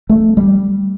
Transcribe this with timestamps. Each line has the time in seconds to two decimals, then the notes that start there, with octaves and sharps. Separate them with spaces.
0.09 A3
0.37 G3